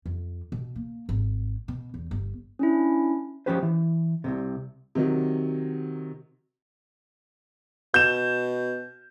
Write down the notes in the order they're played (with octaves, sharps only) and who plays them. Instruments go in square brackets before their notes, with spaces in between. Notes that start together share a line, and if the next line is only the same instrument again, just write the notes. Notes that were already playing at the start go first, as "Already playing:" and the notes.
[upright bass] F2
B2
A#3
G#1
B2
E2
G1
[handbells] C#4 D4 E4
[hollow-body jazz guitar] F3 B3 C#4 G4 B4 C5
E3
C2 G#2 C3
[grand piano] C3 D#3 F#3
[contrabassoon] B2 [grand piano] G6 E7